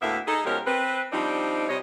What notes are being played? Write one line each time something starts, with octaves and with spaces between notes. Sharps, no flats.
D2 A2 A#3 B3 E5
D#4 G#4 A4
B2 F3 G#3 C#4 G4 A#4
C4 B4
F3 G3 C4 D4 D#4
C3 G3 C#5 D#5